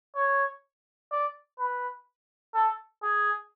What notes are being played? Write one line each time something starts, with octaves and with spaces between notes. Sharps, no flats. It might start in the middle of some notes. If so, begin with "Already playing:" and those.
C#5
D5
B4
A4
G#4